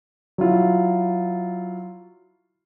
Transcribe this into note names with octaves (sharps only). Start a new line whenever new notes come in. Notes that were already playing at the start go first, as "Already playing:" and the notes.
F#3 E4 F4